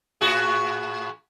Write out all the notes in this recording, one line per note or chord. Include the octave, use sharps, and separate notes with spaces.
A2 F#4 G#4